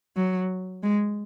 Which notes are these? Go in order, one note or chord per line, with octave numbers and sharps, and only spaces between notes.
F#3
G#3